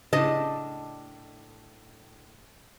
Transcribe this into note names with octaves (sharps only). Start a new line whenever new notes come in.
A2 C#3 D4 D#5 A5